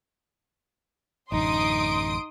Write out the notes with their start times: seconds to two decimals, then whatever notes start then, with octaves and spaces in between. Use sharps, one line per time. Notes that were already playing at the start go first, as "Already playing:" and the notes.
1.32 A1 F#2 D3 D#4 C6 D#6 D7